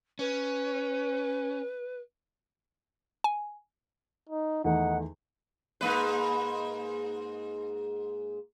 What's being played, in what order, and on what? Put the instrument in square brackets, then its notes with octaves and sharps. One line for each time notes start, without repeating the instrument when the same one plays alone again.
[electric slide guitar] C#4 [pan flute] B4
[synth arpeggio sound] G#5
[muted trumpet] D#4
[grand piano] E2 D#3 A3 [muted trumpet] D#4 [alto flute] F#5
[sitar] G#2 A#3 B4